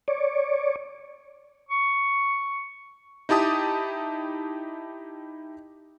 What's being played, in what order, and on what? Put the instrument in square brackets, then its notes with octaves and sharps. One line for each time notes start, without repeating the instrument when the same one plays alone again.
[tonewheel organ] C#5 D5
[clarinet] C#6
[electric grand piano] D#4 E4 G4 A5 D#6